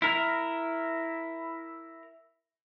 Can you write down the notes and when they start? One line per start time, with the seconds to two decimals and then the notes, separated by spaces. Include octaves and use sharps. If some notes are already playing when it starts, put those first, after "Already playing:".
0.02 E4 A#4